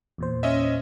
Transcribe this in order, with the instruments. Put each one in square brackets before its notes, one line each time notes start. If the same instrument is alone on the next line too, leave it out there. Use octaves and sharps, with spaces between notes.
[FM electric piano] E2 A#2 C5
[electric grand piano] C#4 D#5 E5